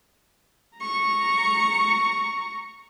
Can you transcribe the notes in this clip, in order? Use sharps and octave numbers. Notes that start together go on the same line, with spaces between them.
A#5 C#6